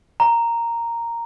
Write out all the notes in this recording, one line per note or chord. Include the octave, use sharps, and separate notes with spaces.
A#5